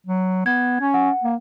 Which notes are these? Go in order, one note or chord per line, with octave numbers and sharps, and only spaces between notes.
F#3
B3 G#6
C#4
F#5
A#3